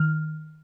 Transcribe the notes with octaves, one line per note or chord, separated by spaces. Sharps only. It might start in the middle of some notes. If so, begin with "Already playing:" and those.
Already playing: D#3 F6